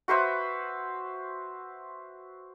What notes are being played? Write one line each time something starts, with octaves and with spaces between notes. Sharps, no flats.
F#4 B4 C5 E5